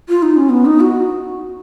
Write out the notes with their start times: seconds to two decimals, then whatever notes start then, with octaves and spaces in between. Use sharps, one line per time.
0.09 F4
0.23 D#4
0.37 C#4
0.50 B3
0.65 D#4
0.80 F#4